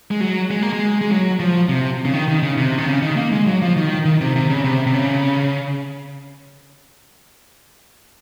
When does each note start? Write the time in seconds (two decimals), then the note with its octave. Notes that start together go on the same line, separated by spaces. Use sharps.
0.11 G#3
0.21 F#3
0.51 G#3
0.62 A#3
0.73 G#3
1.01 G#3
1.10 F#3
1.40 F3
1.69 C3
2.05 C#3
2.13 D#3
2.28 D#3
2.43 C#3
2.57 C3
2.78 D#3
2.87 C#3
3.02 D#3
3.17 A#3
3.32 G#3
3.47 F#3
3.62 F3
3.77 D#3
4.05 D#3
4.21 C3
4.36 C3
4.50 C#3
4.64 C3
4.87 C3
4.94 C#3